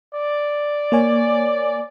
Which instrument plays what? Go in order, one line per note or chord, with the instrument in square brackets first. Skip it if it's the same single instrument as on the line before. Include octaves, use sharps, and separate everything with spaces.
[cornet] D5
[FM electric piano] A#3 C#5 G#5